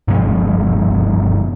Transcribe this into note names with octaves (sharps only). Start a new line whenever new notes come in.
G2 B2 F3 G#3